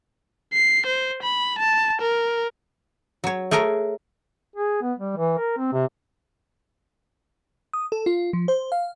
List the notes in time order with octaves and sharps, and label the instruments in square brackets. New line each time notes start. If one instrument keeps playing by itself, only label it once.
[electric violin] C7
C5
B5
A5
A#4
[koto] F#3 C#5
A3 G#4 A#4 C#5 A#5
[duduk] G#4
B3
G3
E3
A#4
C4
C3
[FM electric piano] D#6
A4
F4
F3
C5
F5